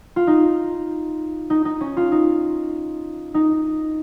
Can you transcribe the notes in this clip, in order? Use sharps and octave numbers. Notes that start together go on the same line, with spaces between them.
F4
D#4
D#4
D#4
C#4
F4
D#4
D#4